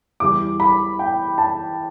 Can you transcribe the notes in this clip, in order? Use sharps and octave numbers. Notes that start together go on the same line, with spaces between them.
E2 E3 G3 D6
B5
G5
A5